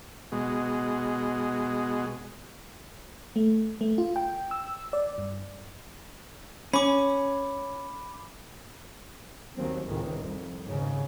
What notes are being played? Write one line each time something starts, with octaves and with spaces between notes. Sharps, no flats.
B2 G#3
A3
A3
F4
G5
E6
D5
G2
C#4 B5 D6
D#2 F#3 C4
C#2 A2 C3 D#3
C2 F2
D#2 G#2 C#3